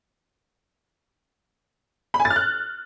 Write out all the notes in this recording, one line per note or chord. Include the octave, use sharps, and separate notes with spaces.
B5
G#5
A6
F6
F#6